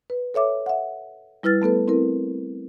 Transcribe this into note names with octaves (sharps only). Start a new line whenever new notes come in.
B4
A4 C#5 E5 D6
E5 F#5
G3 E4 B4 F6 A6
A3 B3 A4 B4
C4 E4 A#4